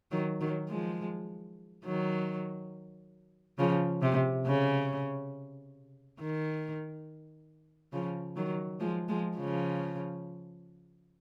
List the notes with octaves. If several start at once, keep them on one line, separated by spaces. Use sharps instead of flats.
D#3 F#3
D#3 F#3
F3 G#3
D#3 F#3
C#3 F3
C3
C#3
D#3
C#3 F3
D#3 F#3
F3 G#3
F3 G#3
C#3 F3